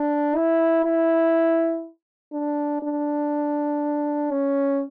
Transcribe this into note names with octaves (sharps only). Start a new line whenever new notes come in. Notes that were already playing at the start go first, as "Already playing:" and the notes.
Already playing: D4
E4
E4
D4
D4
C#4